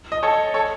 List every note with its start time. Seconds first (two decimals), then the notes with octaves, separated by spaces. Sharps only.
0.12 D#5
0.23 A4 C#5
0.54 A4 C#5